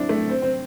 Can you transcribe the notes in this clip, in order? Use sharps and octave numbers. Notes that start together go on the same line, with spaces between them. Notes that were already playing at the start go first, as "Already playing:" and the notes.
Already playing: C4 D4 E4
A3
C4
C4